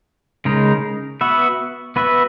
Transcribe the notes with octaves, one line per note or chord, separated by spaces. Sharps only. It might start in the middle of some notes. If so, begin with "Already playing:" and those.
C#3 G#3 D#4 A#4
B3 F#4 B4 E5
B3 F#4 B4 E5